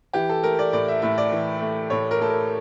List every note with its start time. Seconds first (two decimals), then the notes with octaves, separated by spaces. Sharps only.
0.13 E3 G4
0.29 A4
0.43 A3 A#4
0.59 D5
0.73 A2 D5
0.88 E5
1.02 A2 E5
1.18 D5
1.32 E3
1.61 A3
1.90 A2 C#5
2.11 A#4
2.20 A2 A4
2.30 A#4